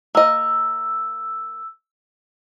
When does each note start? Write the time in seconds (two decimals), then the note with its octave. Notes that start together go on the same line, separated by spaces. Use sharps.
0.15 A#3 D#5 E6